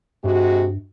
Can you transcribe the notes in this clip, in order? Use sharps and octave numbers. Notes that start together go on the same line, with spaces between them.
G2 C3 G#3 F#4